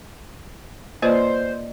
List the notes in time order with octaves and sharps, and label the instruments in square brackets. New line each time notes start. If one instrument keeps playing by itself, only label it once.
[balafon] A#3 F4 B4 [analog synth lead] C5 [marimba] D5 D#5